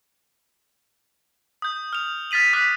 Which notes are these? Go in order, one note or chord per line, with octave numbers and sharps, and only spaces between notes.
D#6 G6
F6 F7
F6 A6 B6 D#7 F#7
D6 D#6 F6 F#6 B6